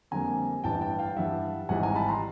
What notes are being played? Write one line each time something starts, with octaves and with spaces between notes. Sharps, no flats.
F2 D3 G3 A#3 G#5 A#5
A1 G2 E3 G5 A5
G5 A5
F5 G5
G2 E3 G3 E5 F#5
G#1 G#2 E3 G3 F#5 G#5
G#5 A#5
A5 B5
A#5 C6